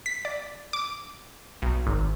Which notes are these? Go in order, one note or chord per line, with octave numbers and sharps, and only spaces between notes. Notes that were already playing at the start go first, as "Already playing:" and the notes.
B6
D5
D6
B1
G#1